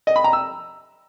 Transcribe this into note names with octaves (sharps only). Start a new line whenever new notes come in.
D#5
B5
A#5
E6